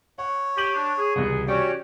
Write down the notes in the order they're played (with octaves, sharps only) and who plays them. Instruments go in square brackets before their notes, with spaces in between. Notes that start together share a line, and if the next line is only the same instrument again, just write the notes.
[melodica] C#5 [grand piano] F#5
[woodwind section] G4 [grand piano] G6 D#7 F#7
[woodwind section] D4
G#4
[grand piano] C#2 F#5 [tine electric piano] C3 E3 G3
[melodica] C#4 G5 [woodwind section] F#4 G4 C#5 [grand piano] D5